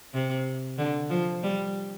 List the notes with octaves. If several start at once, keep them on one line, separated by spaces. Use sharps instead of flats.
C3
D3
F3
G3